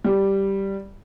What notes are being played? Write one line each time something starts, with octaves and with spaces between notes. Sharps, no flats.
G3